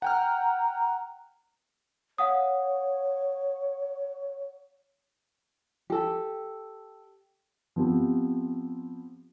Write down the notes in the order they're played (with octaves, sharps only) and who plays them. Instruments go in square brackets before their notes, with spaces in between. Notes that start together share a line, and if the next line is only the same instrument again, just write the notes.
[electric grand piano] F#5 G5 F6 [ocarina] A#5
[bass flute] C#5 [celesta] F5 F#5 D#6
[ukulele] G4 A4
[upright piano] F3 B3 C4 G4